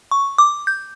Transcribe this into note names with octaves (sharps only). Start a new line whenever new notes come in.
C#6
D6
G6